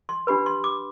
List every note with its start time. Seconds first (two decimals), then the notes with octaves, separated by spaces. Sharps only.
0.09 C6
0.27 D4 G4 B4 B5
0.46 C6
0.64 D6